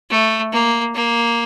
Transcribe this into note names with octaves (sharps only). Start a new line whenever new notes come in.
A3
A#3
A#3